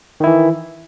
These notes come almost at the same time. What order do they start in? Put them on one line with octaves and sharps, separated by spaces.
D#3 E4 E3